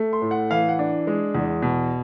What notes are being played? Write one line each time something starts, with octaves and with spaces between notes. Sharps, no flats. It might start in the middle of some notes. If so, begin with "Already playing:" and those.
Already playing: A3
C6
A2
F#5
E3 F5
F#5
D4
G#3
E2
B2